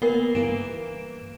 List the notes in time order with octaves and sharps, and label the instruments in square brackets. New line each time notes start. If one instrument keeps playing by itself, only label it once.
[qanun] A#3 [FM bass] B3 [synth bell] A#4 C7 G7
[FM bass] G2 [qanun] E3 A#3 [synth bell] D7 E7